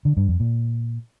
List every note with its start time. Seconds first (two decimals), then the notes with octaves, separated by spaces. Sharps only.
0.05 D3
0.17 G2
0.28 F2
0.40 A#2